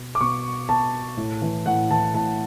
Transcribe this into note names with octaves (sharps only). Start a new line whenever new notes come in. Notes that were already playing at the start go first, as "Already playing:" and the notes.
Already playing: B2
D6
B2 C#6
B2 A5
A2
E3
A2 F#5
E3 A5
A2 A5